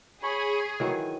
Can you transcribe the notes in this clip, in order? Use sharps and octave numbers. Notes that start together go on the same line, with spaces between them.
G#4 C#5 B5
D#3 E3 F#3 G#5